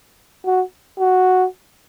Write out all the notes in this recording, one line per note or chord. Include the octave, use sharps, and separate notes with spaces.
F#4
F#4